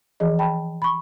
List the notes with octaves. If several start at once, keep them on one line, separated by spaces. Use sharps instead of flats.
E3 F3 G#4 D#5
G5 A5 B5
B5 C#6